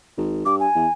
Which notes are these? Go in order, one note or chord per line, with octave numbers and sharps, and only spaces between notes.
G#1
G2 D6
G#5
E2